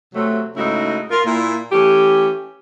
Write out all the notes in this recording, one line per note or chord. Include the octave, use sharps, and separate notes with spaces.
C3 F#3 A3
G#2 C#3 A3 D#4 E4 F#4
F4 A#4
A#2 E4
E3 A3 C#4 G4